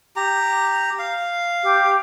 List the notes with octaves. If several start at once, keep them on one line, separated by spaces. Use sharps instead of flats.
G4 A#5
F5
G4